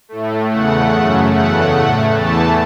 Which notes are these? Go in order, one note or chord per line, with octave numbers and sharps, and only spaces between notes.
A2 A3
E2 C#3 A3 F#5
F#2 C#3 A3
E2 C#3 A3 F#5
A2 A3
E2 E3 A3 A5